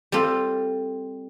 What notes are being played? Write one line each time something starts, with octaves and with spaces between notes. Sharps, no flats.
G3 C4 F4 A4